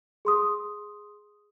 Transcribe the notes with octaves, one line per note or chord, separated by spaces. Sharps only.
G#4 C6 D#6